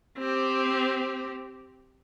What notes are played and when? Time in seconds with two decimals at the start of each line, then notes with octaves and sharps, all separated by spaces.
0.18 C4 G4